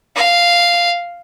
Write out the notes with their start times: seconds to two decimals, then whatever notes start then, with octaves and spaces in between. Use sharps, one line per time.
0.16 F5